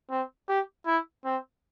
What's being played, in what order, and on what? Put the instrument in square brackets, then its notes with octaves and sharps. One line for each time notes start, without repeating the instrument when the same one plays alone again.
[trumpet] C4
G4
E4
C4